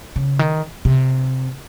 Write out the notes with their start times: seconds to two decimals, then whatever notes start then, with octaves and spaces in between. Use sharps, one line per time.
0.16 C#3
0.39 D#3
0.85 C3